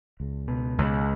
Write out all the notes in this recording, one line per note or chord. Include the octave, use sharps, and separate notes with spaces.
C#2
B2
C#2